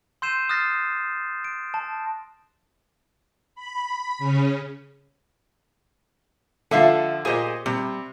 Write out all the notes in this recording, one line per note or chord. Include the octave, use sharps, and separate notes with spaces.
C6 E6 G6 C7 D#7 E7
D#6 F6 F#6 A6 A#6 C7
D7
A5
B5
C#3 C#4
D3 F3 A4 E5 F5
A#2 G4 G#4 C5 D#5
C3 G3